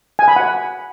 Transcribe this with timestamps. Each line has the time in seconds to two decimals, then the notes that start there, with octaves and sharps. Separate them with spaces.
0.19 G#5
0.28 B5
0.36 F#5